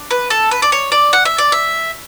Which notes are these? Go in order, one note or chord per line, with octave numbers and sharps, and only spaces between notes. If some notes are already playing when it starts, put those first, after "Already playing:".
Already playing: D4
B4
A4
B4
D5
C#5
D5
F#5
E5
D5
E5